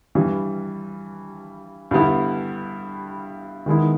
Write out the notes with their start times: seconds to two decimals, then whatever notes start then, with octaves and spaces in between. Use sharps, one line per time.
0.15 G2 E3 G3
1.91 G2 D3 G3 B3 E4
3.66 D#3 G#3 B3 E4